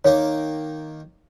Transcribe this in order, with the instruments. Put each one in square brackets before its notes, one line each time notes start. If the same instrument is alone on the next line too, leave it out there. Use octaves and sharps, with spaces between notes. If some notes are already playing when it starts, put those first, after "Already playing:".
[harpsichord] D#3 A#3 D6 [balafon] C#5